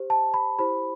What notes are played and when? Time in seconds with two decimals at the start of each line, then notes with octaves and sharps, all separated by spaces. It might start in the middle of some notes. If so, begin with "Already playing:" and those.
Already playing: G4 C5
0.10 A5
0.34 B5
0.59 E4 G4 C5 B5